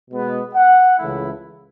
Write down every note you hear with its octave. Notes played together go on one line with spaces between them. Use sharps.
B2 G#3 B3
F#5
C#2 C#3 E3 A3 E4